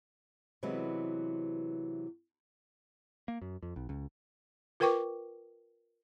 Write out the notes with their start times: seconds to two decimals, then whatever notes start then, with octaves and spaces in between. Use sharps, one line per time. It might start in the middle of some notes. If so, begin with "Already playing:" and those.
0.63 C3 E3 F#3 G#3 B3
3.28 A#3
3.41 F#2
3.62 F2
3.76 B1
3.89 C#2
4.80 F4 A#4 B4 G5 C#6 D6